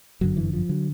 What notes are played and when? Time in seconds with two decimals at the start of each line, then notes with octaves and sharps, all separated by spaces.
0.21 G1 F#2 D3 F#3
0.37 E3
0.53 F3
0.69 D3 F#3